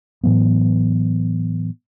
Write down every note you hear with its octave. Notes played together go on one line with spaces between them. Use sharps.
A2 E3 F#3 B3